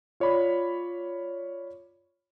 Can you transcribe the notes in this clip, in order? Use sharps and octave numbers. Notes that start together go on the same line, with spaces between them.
F4 C#5 D5 B5